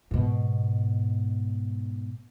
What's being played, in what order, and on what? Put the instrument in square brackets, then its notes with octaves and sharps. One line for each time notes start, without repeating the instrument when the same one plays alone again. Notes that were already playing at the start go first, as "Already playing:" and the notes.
[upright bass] G#2 B2